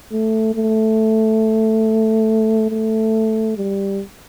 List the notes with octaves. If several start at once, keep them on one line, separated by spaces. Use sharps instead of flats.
A3
A3
A3
G3